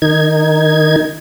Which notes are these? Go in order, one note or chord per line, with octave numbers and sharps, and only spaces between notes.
D#3 D#4 G#6